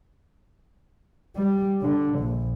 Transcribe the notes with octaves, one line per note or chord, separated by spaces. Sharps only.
G3
D3
A#1